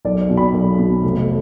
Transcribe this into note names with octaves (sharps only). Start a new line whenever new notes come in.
B1 D5
D5
B2
B5
B1
B2
F1